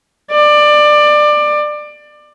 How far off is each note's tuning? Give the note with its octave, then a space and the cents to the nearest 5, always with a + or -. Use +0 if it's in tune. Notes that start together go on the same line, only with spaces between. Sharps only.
D5 +20